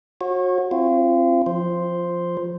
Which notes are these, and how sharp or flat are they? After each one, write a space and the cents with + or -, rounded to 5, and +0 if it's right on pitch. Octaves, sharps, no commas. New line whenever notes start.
F#4 -25 C#5 -40
C4 +15 F4 -35
F3 +0 C5 +0